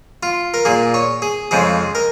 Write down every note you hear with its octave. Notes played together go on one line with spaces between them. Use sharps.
F4
A#4
A#2 A#3 G#4
C#5
G#4
F2 C#3 F3 G#3 G#4
A#4